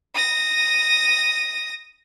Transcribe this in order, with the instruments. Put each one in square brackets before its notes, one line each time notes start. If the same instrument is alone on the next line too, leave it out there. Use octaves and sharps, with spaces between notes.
[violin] D#6 A#6